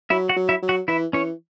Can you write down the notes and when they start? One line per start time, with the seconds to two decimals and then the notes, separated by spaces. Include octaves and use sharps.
0.10 F#3 E4 E5
0.29 F#4 F#5
0.36 F#3
0.49 E4 E5
0.62 F#3
0.69 F#4 F#5
0.88 E3 E4 E5
1.13 E3 C#4 C#5